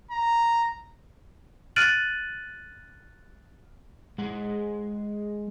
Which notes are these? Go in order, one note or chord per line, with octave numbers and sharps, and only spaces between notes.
A#5
F6 F#6 A6 D7 D#7 F#7
G#3 G#4 F#5